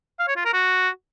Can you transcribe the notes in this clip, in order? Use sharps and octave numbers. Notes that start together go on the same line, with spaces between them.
F5
C#5
F4
A#4
F#4